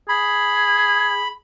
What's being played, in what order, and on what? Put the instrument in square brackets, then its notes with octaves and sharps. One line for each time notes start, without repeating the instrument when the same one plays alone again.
[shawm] G#4 [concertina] B5